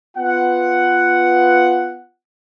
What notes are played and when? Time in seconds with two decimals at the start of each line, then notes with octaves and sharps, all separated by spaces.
0.17 B3 F4 F#5